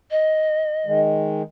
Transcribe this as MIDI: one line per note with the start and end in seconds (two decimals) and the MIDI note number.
0.11 1.00 75
0.86 1.42 51
0.86 1.42 56